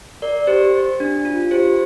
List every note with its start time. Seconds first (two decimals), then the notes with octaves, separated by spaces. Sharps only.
0.22 A#4 D5
0.47 G4 C5
1.00 D4
1.25 F4
1.51 G4 C5